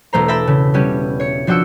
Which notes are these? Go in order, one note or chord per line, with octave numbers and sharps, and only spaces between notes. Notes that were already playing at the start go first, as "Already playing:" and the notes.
E1 A3 C5 A#5
E5 G5 A5 B5 A6 A#6
C#3
G3 B3 C#4 G4
C#5 C#7
F3 D4 F#4 G5 E6 C#7